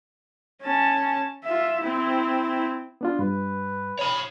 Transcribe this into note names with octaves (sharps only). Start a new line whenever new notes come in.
C#4 A5
F4 E5
C4 E4
B3 D4 F4
G2 B4
C#5 B5